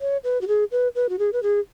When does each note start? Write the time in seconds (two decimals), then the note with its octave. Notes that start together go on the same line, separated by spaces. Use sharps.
0.01 C#5
0.24 B4
0.41 F#4
0.48 G#4
0.71 B4
0.95 B4
1.09 F#4
1.19 G#4
1.33 B4
1.43 G#4